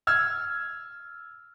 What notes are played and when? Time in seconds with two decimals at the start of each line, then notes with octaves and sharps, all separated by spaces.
0.07 E6 F6 G#6